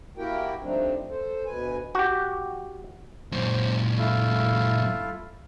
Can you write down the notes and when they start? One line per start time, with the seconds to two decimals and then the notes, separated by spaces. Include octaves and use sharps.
0.17 A#3 E4 F#4 G4 A#4 G5
0.62 F3 G3 A3 C4 D4 D#4
1.09 A4 C5
1.46 D2 B2 B4 G#5
1.95 F#4 G4
3.32 F#2 A#2 C5
3.98 A3 E4 F4